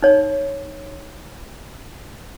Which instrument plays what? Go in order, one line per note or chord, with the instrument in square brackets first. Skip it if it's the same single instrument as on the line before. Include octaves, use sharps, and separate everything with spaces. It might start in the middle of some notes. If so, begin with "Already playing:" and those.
[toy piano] D#4 C#5